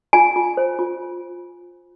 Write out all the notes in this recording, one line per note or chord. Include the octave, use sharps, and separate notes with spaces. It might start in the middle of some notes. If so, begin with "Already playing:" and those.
F4 G#5
F4
C5
F4